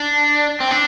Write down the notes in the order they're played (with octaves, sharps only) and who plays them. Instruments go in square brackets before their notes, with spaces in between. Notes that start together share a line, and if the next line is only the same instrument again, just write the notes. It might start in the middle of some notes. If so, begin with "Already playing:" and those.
Already playing: [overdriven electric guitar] D4
C4
D4